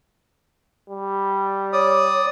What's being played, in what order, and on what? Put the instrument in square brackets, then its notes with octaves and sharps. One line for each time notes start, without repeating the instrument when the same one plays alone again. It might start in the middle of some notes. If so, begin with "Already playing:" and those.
[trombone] G3
[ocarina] C#5 [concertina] D5 D#6